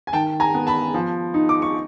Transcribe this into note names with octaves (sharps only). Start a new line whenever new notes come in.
G#5
D#3 G5 A5
G#5 A#5
B3
A5 B5
F3
D#4
D6
C#6